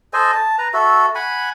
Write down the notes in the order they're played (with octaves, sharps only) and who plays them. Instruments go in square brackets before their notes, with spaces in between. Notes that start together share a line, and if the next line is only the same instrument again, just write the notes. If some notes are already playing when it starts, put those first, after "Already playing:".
[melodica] A4 C5 D#5 G#5
A5
B4 A#5
F#4 A4 E5
F#5 G#5 B5